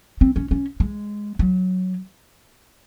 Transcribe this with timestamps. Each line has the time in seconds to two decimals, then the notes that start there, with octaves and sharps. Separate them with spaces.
0.21 C4
0.36 C#4
0.51 C#4
0.80 G#3
1.39 F#3